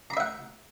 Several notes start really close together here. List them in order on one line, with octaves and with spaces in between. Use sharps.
A#5 B5 E5 F#5